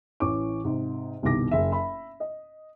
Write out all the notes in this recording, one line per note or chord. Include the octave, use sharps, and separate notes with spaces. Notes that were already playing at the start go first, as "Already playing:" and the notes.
A1 E3 C#4 C#6 D6
G#2 C3
G1 C2 B2 D#3 D6 A#6
F#1 E5
E5 B5
D#5